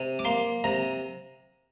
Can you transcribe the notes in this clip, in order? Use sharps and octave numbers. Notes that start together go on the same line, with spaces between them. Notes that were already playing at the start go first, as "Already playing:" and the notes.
Already playing: C3
D6
A#3 C6
C3 A#5